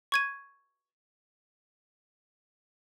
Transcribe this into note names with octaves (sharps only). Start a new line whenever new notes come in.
C#6 G#6 D#7